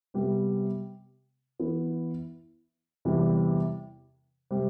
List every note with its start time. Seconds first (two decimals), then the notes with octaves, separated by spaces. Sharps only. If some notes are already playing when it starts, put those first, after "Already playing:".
0.14 C3 G3 B3
1.59 E3 B3 E4
3.05 E2 C3 E3 G3
4.51 C3 G3 C4